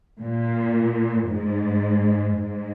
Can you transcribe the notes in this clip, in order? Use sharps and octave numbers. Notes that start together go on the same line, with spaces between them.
A#2
G#2
G#2